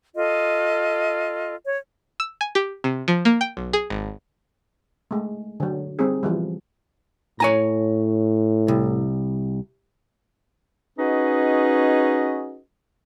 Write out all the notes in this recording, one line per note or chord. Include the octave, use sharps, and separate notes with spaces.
F4 A4 D#5
C#5
E6
G#5
G4
C3
F3
A#3
G5
B1
G#4
G#1
G#3 A3
D3 F#3
G3 C4 D#4 G#4
E3 F3 G3
A2 C#5 G#5 A#5
C2
C#4 D#4 F#4 G#4 B4 D#5